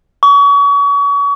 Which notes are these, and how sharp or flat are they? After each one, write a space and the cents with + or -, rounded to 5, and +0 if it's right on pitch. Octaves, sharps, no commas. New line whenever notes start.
C#6 +35